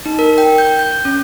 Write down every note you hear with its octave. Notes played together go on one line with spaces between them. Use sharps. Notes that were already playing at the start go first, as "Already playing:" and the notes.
D#4
A#4
G5
G6
G6
C#4